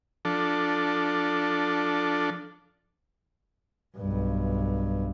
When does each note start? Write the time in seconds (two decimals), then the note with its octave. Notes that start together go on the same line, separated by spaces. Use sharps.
0.25 F3 D4 A4
3.97 B1 G2